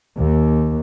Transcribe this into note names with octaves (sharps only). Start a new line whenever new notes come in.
D#2